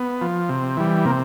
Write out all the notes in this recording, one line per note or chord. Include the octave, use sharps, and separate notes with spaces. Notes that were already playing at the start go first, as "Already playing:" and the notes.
Already playing: B3
F3
C3
E3 G3
C3 A#3